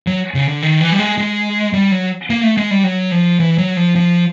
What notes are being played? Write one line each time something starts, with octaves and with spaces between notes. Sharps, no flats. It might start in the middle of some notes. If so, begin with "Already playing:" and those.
F#3
C#3
D3
D#3
E3
G3
G#3
G#3
G3
F#3
A#3
A3
G#3
G3
F#3
F3
E3
F#3
F3
F3